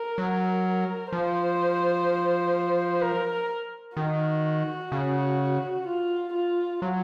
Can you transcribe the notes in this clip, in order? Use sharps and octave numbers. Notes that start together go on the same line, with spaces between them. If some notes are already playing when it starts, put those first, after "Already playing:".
Already playing: A#4
F#3
F3 C5
A#4
D#3 F#4
C#3
F4
F4
F#3